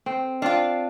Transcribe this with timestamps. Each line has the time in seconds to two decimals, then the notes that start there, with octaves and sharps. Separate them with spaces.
0.06 C4
0.42 C4 D4 F4 F5